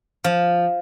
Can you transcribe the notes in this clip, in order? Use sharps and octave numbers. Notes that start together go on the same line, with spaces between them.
F3